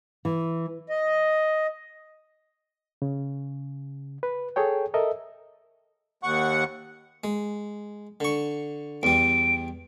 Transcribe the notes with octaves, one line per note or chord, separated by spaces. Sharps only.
E3
D#5
C#3
B4
G#4 A4 C#5 G5
A4 A#4 D#5 E5
D#2 F#5 C#6
G#3
D3 C#6
E2 G3 D7